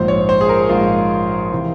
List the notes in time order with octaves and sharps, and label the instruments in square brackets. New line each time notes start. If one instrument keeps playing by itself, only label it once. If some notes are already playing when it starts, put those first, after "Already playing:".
Already playing: [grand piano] A#1 G#2 F3 C5
C#5
C5
G#4
A#4
A#1 G#2 F3 F4
C3 E3